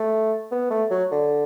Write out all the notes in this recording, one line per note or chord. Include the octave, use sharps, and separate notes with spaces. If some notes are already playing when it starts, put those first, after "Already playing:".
Already playing: A3
B3
A3
F#3
D3